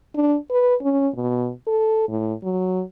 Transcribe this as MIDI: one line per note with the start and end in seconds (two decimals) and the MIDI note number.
0.15 0.36 62
0.50 0.74 71
0.81 1.08 61
1.15 1.50 47
1.67 2.06 69
2.08 2.33 45
2.43 2.82 54